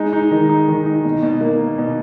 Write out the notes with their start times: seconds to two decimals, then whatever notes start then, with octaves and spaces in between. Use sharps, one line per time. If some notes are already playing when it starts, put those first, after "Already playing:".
Already playing: G#3 D#4
0.13 D#4
0.31 D#3
0.49 D#4
0.68 D#3
0.86 D#4
1.05 B2
1.23 B2
1.41 A#3
1.60 A#3
1.78 B2